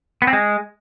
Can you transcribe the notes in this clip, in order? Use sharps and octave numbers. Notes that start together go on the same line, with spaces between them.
B3
C4
G#3